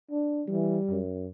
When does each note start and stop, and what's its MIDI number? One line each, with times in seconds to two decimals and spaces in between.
0.11 0.43 62
0.48 0.78 52
0.48 1.00 55
0.90 1.29 42